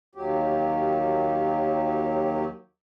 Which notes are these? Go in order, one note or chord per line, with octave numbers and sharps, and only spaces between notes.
D#2 F#3 G4